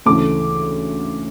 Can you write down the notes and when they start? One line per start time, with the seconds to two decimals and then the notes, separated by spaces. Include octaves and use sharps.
0.06 D2 C#3 E3 A3 D6